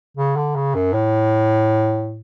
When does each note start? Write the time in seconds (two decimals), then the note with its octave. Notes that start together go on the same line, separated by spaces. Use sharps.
0.17 C#3
0.36 D3
0.55 C#3
0.75 F#2
0.93 A2